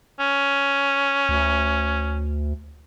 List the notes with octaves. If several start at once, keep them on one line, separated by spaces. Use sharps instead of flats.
C#4
D2